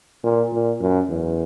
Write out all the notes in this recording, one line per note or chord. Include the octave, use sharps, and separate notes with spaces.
A#2
A#2
F#2
E2